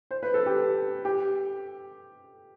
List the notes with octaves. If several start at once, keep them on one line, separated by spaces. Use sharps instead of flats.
C5
B4
A4
G4
G4